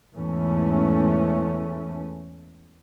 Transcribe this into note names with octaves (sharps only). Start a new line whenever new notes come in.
E2 G#2 E3 A3 C#4